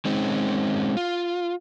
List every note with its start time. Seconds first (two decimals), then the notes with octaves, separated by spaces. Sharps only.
0.05 G#3 C4 C#4 D#4
0.97 F4